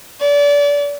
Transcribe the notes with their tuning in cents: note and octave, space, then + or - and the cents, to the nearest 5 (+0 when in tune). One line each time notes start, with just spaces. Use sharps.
D5 -30